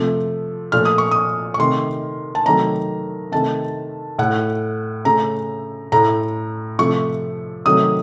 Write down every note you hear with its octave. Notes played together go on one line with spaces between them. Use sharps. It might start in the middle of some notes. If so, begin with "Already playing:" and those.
Already playing: C3 F3 A3
A#2 F3 A3 F6
D#6
C#6
D#6
C#6
C3 D#3 A3 C6
A5
C3 D#3 F#3 A3 A#5
C3 D#3 A3 A5
A2 A3 F#5
C#3 A3 A#5
A2 A3 A#5
C3 F3 A3 C#6
C3 D#3 F#3 A3 D#6